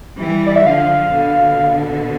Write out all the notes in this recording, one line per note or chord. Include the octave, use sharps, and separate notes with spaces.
E3 G3
D5
E5
D3 F3 F5
B2 D3